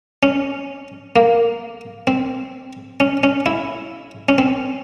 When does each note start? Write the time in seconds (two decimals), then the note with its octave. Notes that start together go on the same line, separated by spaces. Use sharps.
0.23 C#4
1.16 A#3
2.07 C4
3.00 C#4
3.23 C#4
3.46 E4
4.29 C#4
4.38 C4